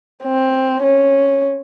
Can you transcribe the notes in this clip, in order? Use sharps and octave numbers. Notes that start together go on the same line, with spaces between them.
C4
C#4